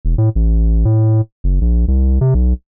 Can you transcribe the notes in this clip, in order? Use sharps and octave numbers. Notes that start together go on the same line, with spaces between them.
E1
A2
A1
A2
F#1
A#1
C2
C3
B1